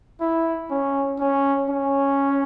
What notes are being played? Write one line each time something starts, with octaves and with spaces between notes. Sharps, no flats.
E4
C#4
C#4
C#4